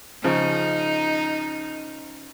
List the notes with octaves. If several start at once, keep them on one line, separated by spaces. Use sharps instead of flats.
C#3 F3 D#4